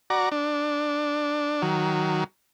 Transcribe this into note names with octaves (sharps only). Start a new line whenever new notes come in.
F#4 D5 A#5
D4
D#3 F#3